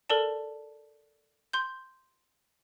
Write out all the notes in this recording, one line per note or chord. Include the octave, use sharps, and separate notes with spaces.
A4 A#4 D5 A5
C6 G6